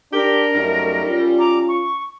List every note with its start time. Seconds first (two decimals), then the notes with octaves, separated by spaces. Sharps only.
0.12 D4 G4 A#4
0.55 F#2 G3 A3 D#4
1.06 C#4 F4
1.38 A#5 D6
1.69 C#6